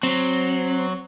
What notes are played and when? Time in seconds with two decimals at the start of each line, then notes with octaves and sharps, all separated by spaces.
0.03 F#3 C4